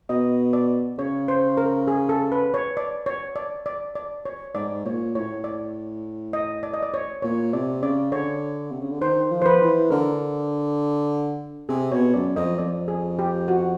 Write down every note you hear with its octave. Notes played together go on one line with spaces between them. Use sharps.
B2 D#5
D5
C#3 C#5
C5
A#4
G#4
A4
B4
C#5
D5
C#5
D5
D5
D5
C#5
G#2 D5
A#2 C#5
A2 C#5
D5
D#5
D5
D#5
D5
C#5
A#2 C#5
C3 D5
C#3 D5
D3 C#5
C3
C#3
D3
D#3 C5
F3
C5
B4
E3
D3 A#4
C3 G#4
B2 C#5
F#2 D5
F2 D#5
F2 D5
G#4
G4
F#4